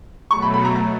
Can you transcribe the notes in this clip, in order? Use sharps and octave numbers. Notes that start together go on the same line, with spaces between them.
B2 F#3 A3 C#6
B5
B5
A#5
A#5